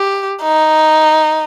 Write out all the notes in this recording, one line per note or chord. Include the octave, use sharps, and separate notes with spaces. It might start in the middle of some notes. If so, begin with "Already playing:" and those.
Already playing: G4
D#4